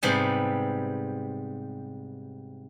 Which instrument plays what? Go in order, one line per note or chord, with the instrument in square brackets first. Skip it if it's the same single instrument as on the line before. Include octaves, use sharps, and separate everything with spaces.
[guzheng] G#2 C3 G3 B3